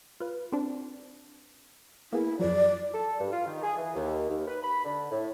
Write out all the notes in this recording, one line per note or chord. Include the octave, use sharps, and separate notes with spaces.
F4 B4
C4 D4
A#3 B3 E4 G#4
F#2 F3 F#3 D5
A4
G2
F4
D#3
G#4
E3
D#2
D#2
B4
B5
D3
A2